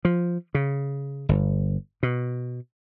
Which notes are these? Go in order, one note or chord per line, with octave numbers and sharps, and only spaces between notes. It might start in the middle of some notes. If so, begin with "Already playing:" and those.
F3
C#3
G1
B2